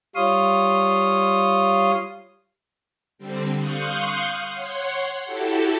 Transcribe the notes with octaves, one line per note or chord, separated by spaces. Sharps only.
G3 F4 C#5 F5 C6 D#6
D3 G3 C4
F5 C6 C#6 D#6 F#6 G6
C#5 F#5 C6
E4 F#4 G4 A4